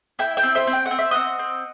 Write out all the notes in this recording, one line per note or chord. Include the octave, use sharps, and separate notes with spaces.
E4 E5 G5
E5 G5
C4
C5 E5
C4
G5
F#5
C4
E5
C4 D#5 F#5
C4